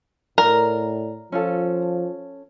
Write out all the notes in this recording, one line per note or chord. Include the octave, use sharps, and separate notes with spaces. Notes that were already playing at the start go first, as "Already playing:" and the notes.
A2 A#4 D5 A#5
F3 C#4 F4 A4